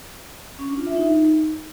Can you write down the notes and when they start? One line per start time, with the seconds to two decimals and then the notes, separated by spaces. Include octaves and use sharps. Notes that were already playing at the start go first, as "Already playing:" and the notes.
0.59 C#4
0.68 D4
0.77 F4
0.87 E5
0.96 D#4